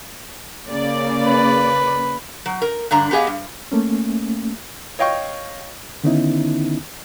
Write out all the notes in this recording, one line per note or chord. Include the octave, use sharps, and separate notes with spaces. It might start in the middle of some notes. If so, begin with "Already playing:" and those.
C#3 A#3 D5
B4
F#3
A#4
G2 D3 D4 A#5
B3 G4 G#4 D#5 F5
G2
A3 A#3 C#4
C#5 D#5 F5 G5 C#6
D3 D#3 B3 C#4 D#4 E4